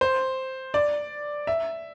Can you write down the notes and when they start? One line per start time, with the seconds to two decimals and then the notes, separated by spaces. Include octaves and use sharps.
0.01 C5
0.74 D5
1.47 E5